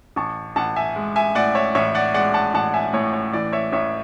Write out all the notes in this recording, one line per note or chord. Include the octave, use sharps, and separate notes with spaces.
A1 A5 C#6
A1 F#5 A5
E5 G#5
G#3
E5 G#5
A2 D5 F#5
C#5 E5
A1 C#5 E5
D5 F#5
G#3 D5 F#5
F#5 A5
A1 F#5 A5
E5 G#5
A2 C#5
C#5
E3 D5
C#5 E5
A1 C#5 E5